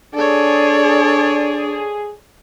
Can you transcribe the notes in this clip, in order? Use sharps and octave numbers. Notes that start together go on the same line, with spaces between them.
D4 G#4 A4 C#5 D5